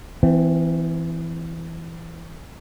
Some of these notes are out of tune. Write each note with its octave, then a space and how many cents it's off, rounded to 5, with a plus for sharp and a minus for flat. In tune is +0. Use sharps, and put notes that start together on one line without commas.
E3 +0 C4 -35